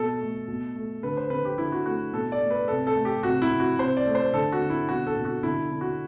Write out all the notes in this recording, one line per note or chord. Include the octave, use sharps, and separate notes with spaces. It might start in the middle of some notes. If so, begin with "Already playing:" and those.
Already playing: B2 A4
A3
B2
A3
D3 B4
C5
D3 B4
G4
D3 E4
F#4
A3 F#4
B2 A4
D5
A3
B4
C3 A4
A4
A3
G4
C3 F#4
E4
C3
F#4
C3 C5
D5
A3
C5
D3 A4
F#4
D3
E4
B2 F#4
A4
B2
F#4
D3 E4
D3
F#4